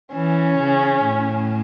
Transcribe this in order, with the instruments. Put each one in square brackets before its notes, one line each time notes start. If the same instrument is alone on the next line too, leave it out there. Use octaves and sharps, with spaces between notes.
[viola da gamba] E3 [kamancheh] C#4
[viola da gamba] C#3
A2